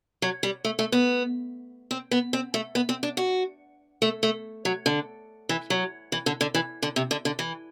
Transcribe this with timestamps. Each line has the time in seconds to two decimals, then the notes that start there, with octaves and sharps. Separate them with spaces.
0.22 F#3
0.43 G3
0.65 A3
0.79 A3
0.92 B3
1.91 C4
2.11 B3
2.33 C4
2.54 A3
2.75 B3
2.89 C4
3.03 D4
3.17 F#4
4.02 A3
4.23 A3
4.65 F#3
4.86 D3
5.49 E3
5.70 F#3
6.12 E3
6.26 D3
6.41 D3
6.55 E3
6.83 D3
6.96 C3
7.11 D3
7.25 D3
7.39 E3